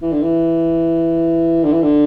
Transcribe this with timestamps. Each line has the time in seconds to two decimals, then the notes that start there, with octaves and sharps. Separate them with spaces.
0.02 E3
0.12 D3
0.22 E3
1.64 D3
1.72 E3
1.83 D3